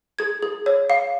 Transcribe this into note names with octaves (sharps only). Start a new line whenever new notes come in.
G#4 G#6
G#4
C#5
F5